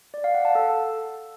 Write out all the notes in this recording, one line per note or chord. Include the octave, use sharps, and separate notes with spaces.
D5
F5
F#5
A5
A4